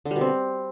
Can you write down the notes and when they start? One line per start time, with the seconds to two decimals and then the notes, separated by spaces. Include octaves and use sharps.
0.05 D3
0.11 G3
0.16 B2
0.21 C4